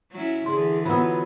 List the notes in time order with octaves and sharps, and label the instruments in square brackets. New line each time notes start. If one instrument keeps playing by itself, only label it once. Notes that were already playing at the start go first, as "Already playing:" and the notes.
[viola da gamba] F#3 C#4 E4
[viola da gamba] D3 E3 [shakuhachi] G#4 [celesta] C6
[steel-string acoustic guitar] F#3 B3 [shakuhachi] F4 [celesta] B5 E6